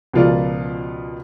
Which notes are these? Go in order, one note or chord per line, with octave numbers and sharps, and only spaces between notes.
C#2 B2 F3 F4 A#4 D5